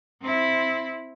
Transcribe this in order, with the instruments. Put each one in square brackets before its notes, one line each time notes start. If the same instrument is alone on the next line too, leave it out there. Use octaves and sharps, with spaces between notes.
[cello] C4 E4